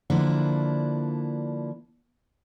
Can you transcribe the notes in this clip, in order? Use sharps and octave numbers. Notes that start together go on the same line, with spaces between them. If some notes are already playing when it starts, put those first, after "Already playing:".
D3 F3 A#3 D4 E4